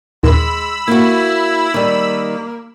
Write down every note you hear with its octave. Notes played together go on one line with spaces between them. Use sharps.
D#2 A#2 G#3 B5 E6
A#3 E4 F#4
D#3 G3 A#3